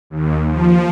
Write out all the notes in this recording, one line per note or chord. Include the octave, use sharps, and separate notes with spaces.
D#2
F3